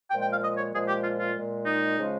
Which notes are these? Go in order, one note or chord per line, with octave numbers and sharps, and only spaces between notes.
A#2 F3 G#3 G5
G5
F5
D#5
C#5
A#2 F3 G#3 G#4
G4
F4
F4
A#2 G#3
D#4
C#3 F3 G#3